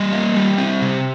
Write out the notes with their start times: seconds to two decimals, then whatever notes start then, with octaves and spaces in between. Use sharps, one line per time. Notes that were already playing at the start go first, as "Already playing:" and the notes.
Already playing: G3 D#5
0.13 A#3
0.36 G3
0.58 C4
0.81 C3